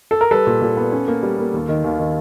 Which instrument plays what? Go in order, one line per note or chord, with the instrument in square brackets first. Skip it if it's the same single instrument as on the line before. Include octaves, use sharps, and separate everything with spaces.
[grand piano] A4
A#4
G3 A4 B4
A#2
A#2
B3
C#4
A#3
G3
A#3
D#2
D#3
D#2
D#3